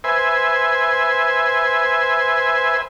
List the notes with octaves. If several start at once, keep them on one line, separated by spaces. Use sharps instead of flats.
B4 C5 E5 G#5